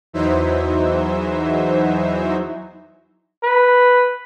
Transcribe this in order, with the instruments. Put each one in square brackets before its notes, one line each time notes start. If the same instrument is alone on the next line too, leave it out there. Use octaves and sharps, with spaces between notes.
[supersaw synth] E2 E3 F#3 D#4 C5 E5
[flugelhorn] B4